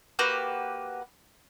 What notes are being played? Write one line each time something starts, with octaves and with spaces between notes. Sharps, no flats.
A#3 F#4 G4 B4